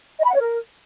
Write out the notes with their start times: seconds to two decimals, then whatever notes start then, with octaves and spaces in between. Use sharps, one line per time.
0.18 D#5
0.24 B5
0.29 F#5
0.35 C#5
0.41 A#4